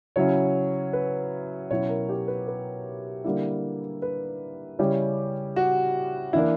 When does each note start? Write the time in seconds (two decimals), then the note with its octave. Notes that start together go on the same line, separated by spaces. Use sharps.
0.16 C#3 F#3 C#4 E4 C#5
0.93 B4
1.70 B2 F#3 C#4 E4 C#5
1.89 A#4
2.09 G4
2.28 B4
2.48 B4
3.24 D3 G3 A#3 E4
4.02 B4
4.79 C#3 G3 C#4 E4 G4
5.56 F#4
6.33 E3 A#3 D4 E4